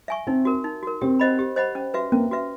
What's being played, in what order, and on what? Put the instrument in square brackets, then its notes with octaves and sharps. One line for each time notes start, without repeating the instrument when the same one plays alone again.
[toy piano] E5 G#5 C#6
[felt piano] C4 [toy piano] D#4
[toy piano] F#4 A#4
D#4
F#4 A#4
[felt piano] C4 [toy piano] G4
[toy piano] C5 D#5 F#5 B5
G4
C5 D#5 F#5 B5
C#4
F#4 B4 E5
[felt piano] A#3 [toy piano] C#4
[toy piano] F#4 B4 E5